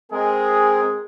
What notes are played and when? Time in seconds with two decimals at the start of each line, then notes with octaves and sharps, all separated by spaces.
0.12 G#3 C4 G#4 A#4